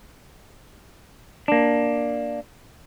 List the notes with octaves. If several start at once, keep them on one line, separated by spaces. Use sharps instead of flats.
A#3 D4